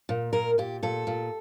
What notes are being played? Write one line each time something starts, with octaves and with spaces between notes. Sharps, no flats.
A#2
A#2 A#4
A#2 G4
A#2 A4
A#2